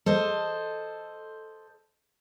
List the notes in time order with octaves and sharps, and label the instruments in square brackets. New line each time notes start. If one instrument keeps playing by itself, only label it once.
[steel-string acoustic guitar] A4 C5 D#5